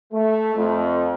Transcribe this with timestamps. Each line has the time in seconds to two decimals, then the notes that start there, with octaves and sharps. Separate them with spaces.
0.12 A3
0.56 F2